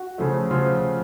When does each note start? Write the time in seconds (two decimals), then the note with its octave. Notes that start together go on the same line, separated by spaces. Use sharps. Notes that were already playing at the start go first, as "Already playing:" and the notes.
Already playing: F#4
0.18 C#3 F3 A3
0.51 C#3 F3 F4